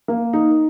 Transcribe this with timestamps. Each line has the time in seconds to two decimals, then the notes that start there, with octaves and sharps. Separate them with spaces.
0.08 A#3
0.33 D#4